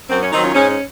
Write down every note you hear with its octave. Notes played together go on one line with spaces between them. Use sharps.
F#2 C4
C#4
D#3 F#3 C4 D#4
C#4 F4
G#2 C#4
C#4